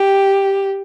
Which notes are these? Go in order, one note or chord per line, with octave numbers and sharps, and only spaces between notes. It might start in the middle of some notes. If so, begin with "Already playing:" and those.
Already playing: G4